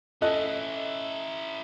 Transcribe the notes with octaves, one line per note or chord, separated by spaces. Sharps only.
C#4 E4 A4 D#5 F#6